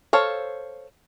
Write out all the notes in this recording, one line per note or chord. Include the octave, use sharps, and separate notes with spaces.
A4 C5 C#5 F5